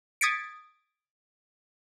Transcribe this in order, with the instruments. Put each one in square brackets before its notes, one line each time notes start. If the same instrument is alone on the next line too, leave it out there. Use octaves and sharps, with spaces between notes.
[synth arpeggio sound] D#6 G#6 A6 B6 C#7 D7